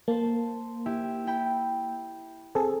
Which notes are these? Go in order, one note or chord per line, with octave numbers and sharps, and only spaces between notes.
A#3 C5 A5
E4 G4 E5
E4 G5 B5
C4 G#4 A4